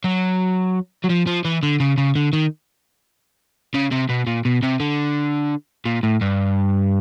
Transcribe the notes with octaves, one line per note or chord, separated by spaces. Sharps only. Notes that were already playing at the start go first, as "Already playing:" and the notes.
F#3
F#3
F3
F3
E3
D3
C#3
C#3
D3
D#3
C#3
C3
B2
A#2
B2
C3
D3
A#2
A2
G2